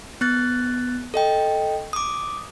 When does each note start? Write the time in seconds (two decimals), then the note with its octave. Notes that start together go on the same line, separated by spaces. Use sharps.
0.21 B3 F#6 A6
1.14 A4 D#5 G5
1.93 D6 D#6